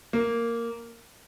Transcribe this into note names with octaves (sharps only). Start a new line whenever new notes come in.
A#3